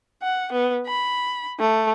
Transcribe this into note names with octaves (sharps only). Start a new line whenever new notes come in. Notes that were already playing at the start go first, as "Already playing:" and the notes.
F#5
B3
B5
A3